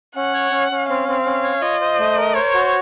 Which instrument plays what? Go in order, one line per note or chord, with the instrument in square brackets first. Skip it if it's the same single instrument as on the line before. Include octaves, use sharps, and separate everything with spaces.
[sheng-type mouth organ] C#4 [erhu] F#5
[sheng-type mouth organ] C#5
C#4
C#4
[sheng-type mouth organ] C4 [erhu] F5
[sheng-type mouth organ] C4
C#4
C#5
[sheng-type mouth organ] F4 [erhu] D#5
[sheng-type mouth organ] C5
A3
A#4
[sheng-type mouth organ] C5 [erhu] C#5
[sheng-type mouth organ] F#4